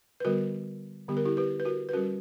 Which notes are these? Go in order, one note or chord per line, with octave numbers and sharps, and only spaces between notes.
B4
D3 G3 B3 F#4 A#4
D3 G3 B3 G4
A#4
E4 G4
G4 B4
B4
F#4 A#4
B4
G3 C#4 F#4 A#4